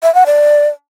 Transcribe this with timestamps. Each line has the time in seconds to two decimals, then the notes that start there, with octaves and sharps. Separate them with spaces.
0.03 E5
0.15 F#5
0.26 D5